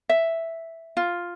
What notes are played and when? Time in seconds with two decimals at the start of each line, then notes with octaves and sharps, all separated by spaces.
0.09 E5
0.97 F4